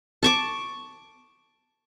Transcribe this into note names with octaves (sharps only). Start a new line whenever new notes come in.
A5 C#6 D6